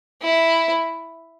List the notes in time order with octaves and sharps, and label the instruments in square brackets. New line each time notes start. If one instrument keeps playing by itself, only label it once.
[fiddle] E4